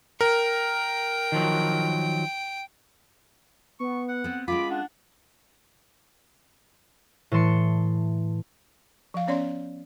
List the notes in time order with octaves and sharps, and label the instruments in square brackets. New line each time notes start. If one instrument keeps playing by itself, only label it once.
[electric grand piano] A#4 [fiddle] G5
[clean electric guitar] D#3 F3 F#3
[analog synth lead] B3 [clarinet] C#6
[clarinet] F#5
[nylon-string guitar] B3 C4
[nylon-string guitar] G#3 C#4 F4 [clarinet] B5 [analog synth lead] D6
[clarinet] D4 [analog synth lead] F#5
[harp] A2 E3 A5 C6 C#7
[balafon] F3 F5
B3 C#4 C#5 D5 C6